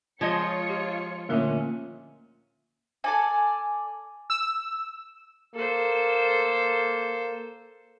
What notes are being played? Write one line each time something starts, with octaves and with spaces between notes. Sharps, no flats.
F3 G#3 F4 C#5 D#5 C#7
G4
D2 A#2 A#3 C#4 A#4 E5
A4 D5 G#5
E6
A#3 A4 C5